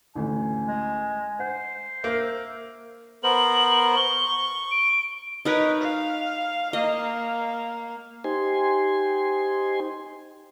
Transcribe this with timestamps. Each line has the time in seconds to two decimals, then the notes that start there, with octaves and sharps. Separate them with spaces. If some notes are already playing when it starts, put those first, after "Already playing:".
0.15 A1 D2 G#5
0.68 G#3
1.40 C5 F#5
2.04 A#3 E5 F6 G6
3.23 B3 A#4 C5 F#7
3.96 C#6 G7
4.71 D7
5.45 D#4 A#4 B4 C#5
5.81 F5
6.73 A#3 D#5
8.24 D#4 G4 C5 G#5 C6